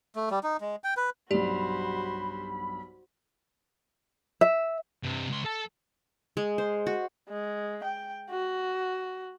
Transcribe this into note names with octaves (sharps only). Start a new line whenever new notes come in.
A3
G3
D#4
G#3
G5
B4
B1 G2 F#4 G4 C5 D5 B5
E5
G2 C3
C#2 C6
A4 A5
G#3
C5
F#4
G#3
G5
F#4